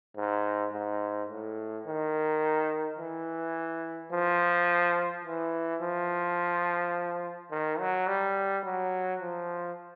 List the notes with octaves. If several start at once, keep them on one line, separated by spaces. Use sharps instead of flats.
G#2
G#2
A2
D#3
E3
F3
E3
F3
D#3
F#3
G3
F#3
F3